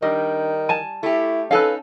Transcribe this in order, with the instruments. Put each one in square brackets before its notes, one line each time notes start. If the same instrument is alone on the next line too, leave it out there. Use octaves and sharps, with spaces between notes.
[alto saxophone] D#3 [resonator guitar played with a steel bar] G3 [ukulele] D4 D#5
[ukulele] G#5 A5
[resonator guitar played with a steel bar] A3 G4 [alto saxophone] E4
[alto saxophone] C#4 [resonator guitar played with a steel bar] D#4 A4 [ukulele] B4 F5